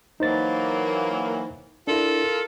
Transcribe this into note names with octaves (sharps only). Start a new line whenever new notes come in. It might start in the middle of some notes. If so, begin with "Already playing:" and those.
E3 F#3 A#3 D#4 C5 A6
D4 E4 F4 A4 A#4